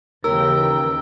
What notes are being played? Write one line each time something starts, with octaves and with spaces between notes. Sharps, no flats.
D#2 C#3 E3 A#4 G5 E6